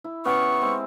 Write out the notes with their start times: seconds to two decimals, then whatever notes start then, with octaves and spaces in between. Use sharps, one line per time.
0.04 E4
0.25 B3 C#4 G4 C#6
0.61 G#3 C4